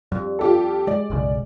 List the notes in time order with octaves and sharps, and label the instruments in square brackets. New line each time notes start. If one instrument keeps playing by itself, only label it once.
[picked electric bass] F2 [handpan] G3
[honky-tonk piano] F4 G4 A4
[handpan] G#3 [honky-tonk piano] D5
[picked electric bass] F#1 B1 C#3